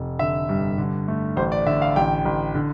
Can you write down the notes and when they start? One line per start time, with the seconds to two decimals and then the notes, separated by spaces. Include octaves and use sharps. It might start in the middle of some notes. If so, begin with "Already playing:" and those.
Already playing: F1
0.19 D3 E5
0.49 G2
0.78 D3
1.08 A3
1.37 A1 C5
1.52 D5
1.66 D3 E5
1.82 F5
1.96 A1 G5
2.25 A1
2.55 D3